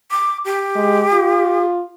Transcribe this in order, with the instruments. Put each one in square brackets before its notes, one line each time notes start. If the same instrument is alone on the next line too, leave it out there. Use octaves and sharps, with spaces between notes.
[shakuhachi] D6
G4
[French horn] G#3
F4